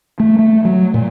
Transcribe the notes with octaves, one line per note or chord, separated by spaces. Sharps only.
A3
A3
F#3
A#2